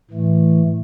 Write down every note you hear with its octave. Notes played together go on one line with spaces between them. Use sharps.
A2 E3 A3